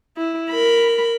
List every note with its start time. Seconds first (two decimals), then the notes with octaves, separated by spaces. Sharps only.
0.17 E4
0.51 A#4 B5